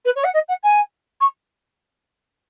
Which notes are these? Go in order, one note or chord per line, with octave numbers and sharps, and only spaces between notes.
B4
C#5
F#5
D#5
F#5
G#5
C#6